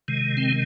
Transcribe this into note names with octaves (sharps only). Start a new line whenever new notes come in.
C3 D#3 G#3
C4